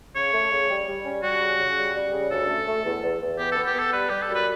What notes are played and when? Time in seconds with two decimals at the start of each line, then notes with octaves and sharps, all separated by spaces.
0.16 C#3 C#5
0.33 A3
0.51 C#3
0.70 G3
0.88 G3
1.05 C#4
1.23 G3 F#4
1.42 C#3
1.60 C#3
1.77 G3
1.95 G3
2.13 C#3
2.31 D2 A4
2.49 A3
2.67 A3
2.85 E2
3.03 E2
3.21 E2
3.39 B3 G4
3.52 A4
3.57 B3
3.66 G4
3.75 B3 A4
3.92 G3 B4
4.09 G3 G4
4.22 A4
4.28 F#2
4.35 B4